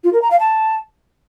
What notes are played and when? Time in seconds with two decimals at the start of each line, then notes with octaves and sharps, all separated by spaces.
0.04 F4
0.13 A#4
0.22 A#5
0.31 F5
0.40 A5